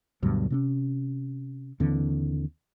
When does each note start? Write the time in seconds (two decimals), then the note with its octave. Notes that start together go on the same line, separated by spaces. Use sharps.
0.22 D2 G2 B2 F#3
0.50 C3 C4 C#4
1.80 D#2 D3 E3 C4